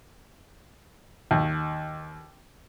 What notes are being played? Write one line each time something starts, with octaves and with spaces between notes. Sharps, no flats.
D#2